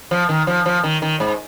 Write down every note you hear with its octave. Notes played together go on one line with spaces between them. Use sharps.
F3
D#3
F3
F3
D#3
D#3
G#2